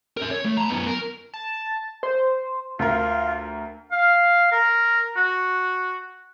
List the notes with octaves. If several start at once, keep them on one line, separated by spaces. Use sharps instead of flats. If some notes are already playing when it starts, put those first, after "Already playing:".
A#4 E5
C#5
A3
A5 A#5
F#2 B3
A#4
A5
C5
D2 F4 A#4
F5
A#4
F#4